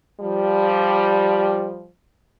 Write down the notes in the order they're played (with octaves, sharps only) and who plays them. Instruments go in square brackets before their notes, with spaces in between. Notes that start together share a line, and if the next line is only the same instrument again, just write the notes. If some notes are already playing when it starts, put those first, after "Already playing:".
[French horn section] F3 G3